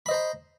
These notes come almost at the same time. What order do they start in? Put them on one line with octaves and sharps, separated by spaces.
B5 D#5 C5 A#5